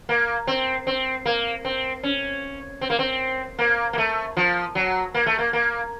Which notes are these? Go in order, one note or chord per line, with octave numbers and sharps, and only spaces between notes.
A#3
C4
C4
A#3
C4
C#4
C4
A#3
C4
A#3
A#3
A3
F3
F#3
A#3
A3
A#3
A#3